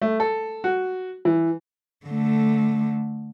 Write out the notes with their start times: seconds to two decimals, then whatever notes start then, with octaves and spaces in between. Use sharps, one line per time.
0.02 A3
0.20 A4
0.64 F#4
1.25 E3
2.06 D3 A3